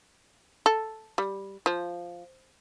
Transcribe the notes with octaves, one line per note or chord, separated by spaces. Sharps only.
A4
G3
F3